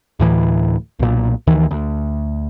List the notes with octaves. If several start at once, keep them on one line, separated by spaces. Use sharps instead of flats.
D2 A2 E3
B1 A#2
D2 D#3 E3
D2